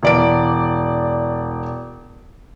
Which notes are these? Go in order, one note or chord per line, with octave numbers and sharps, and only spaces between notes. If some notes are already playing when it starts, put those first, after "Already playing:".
E1 D5 D7